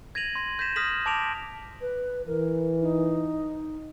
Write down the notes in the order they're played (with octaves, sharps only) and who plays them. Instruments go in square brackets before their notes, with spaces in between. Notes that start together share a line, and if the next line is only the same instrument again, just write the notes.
[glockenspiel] G#6 A#6 D#7 F7 F#7
C6 G#6 A#6
G6 A#6 B6 E7
D#6 F6 A#6 B6 E7 F#7
A5 D6 D7 F7
[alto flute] B4
[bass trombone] E3 [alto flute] A#4
[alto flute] D#4